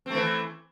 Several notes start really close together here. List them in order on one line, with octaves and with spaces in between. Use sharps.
C4 A3 E3